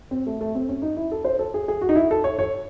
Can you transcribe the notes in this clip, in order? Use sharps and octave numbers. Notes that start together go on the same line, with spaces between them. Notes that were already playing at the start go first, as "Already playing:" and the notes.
C4
A3
A3
C4
C#4
D#4
E4
A4
C5
A4
G#4
G#4
F#4
D#4
E4
A4
C#5
C#5